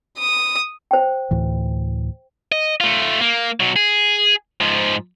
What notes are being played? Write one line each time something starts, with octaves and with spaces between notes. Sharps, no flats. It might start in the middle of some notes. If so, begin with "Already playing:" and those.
D#6
C5 G5
D2 A2 E3
D#5
A3 F4
A#3
B2 F#3
G#4
G#2 F3